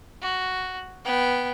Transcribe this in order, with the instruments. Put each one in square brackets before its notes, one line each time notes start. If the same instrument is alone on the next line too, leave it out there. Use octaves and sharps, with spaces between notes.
[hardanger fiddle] F#4
B3 G5